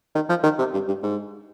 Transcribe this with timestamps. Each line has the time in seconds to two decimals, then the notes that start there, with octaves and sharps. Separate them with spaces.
0.15 D#3
0.29 F3
0.43 D#3
0.58 C3
0.73 G2
0.88 G2
1.03 G#2